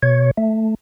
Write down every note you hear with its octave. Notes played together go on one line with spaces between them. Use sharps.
B2 C#5
A3